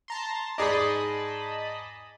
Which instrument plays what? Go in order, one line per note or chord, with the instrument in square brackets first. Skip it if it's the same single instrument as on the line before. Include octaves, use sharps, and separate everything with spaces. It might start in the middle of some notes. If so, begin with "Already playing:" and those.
[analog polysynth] A5 A#5 C6
[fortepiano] G#2 G#4 D5 [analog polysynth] D#5 A5 B5